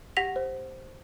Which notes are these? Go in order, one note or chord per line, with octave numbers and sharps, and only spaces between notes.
G4 F#5 A#6 B6 F7
C5